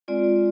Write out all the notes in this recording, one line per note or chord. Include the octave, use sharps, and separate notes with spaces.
G#3 C4 F4 D5